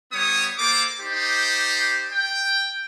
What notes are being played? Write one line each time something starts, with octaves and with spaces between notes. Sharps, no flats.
G3 B3 C#5 D#6
A#3 A4 C5 D6
D#4 G4 C5 D5
G5